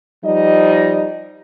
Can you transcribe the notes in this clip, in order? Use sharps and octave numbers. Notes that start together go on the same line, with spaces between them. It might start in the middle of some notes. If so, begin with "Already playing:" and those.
F3 G3 D#4 D#5